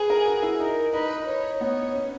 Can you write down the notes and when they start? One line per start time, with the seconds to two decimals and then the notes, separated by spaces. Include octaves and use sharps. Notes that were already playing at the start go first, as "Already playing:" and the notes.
Already playing: G#4 B4
0.10 A#4
0.26 F#4
0.42 E4
0.59 D#4 A#4
0.93 D#4 B4
1.27 C#5
1.61 B3 C#5
1.95 C#4